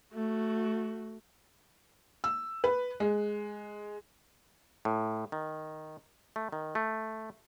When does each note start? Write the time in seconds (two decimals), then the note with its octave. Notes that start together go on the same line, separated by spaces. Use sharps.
0.13 A3 F#4
2.24 E6
2.64 B4
3.00 G#3
4.85 A2
5.32 D#3
6.36 A3
6.52 D#3
6.75 A3